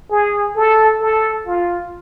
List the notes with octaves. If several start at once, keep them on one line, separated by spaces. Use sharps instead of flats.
G#4
A4
A4
F4